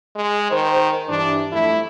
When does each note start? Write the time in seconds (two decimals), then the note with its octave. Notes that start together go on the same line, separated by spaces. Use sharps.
0.16 G#3
0.51 D#3 C5
1.09 G2 E3 D4
1.53 F2 A3 E4